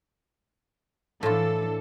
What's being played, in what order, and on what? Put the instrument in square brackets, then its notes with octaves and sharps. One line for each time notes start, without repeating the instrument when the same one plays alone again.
[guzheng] A2 F4 [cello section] E3 D4 A4